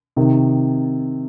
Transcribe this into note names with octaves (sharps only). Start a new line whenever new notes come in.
C3 D#3